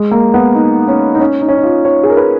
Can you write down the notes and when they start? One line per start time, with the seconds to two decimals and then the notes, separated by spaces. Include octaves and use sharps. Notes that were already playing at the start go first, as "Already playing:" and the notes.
Already playing: G#3
0.11 A#3
0.34 B3
0.55 D#4
0.88 C#4
1.15 D#4
1.19 C#4
1.41 D#4
1.49 C#4
1.57 D#4
1.63 F4
1.85 C#5
2.03 G#4
2.10 A#4
2.17 B4